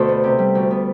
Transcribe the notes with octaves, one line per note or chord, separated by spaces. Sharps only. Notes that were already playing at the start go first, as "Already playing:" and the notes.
Already playing: D2 B2 A3 G4 A4 C5
B3
C3
G3
D2
B3